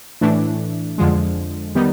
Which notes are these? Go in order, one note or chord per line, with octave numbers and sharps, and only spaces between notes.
A2 E3 A3 D4
F2 D3 F3 G#3
D#3 G3 B3 D#4